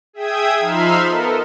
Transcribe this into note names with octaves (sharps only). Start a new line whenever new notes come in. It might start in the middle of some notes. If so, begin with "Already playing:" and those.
G#4 E5 G5 D#6 G#6
F3 D#4 E5 F5 B5 C6
B3 A4 A#4 D#5